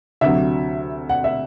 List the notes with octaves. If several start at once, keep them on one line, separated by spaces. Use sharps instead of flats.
D2 C3 F#3 E5
F#5
E5